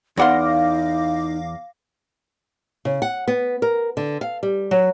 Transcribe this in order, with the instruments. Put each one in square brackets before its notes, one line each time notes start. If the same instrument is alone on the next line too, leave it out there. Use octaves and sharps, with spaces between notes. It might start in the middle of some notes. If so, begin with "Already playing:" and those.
[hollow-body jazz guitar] E2 F#5 C6 [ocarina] D#4 [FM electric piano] F5 D6 A#6
[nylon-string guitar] C#3
F#5
B3
A#4
D3
F5
G3
F#3